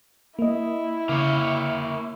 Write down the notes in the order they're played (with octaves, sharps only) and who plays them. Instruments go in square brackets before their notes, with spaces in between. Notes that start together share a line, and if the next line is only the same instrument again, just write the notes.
[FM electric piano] A#3 D#5 [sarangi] E4
[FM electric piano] C#3 [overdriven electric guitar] A#3 C#5